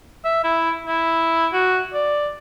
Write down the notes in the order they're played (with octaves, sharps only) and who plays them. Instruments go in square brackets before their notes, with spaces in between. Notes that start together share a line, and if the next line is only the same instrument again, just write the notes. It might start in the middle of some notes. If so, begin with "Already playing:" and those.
[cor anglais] E5
E4
E4
F#4
D5